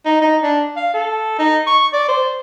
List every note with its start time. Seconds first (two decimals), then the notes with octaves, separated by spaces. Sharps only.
0.05 D#4
0.22 D#4
0.43 D4
0.76 F5
0.94 A4
1.38 D#4
1.67 C#6
1.93 D5
2.08 C5